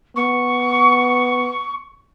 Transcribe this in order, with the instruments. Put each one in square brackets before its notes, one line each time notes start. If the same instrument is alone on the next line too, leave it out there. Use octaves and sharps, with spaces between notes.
[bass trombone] B3 [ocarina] C#6